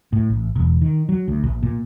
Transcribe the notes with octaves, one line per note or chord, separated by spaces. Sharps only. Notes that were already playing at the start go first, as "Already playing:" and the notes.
A2
A1
E1
D#3
F#3
D2
A#1
A#2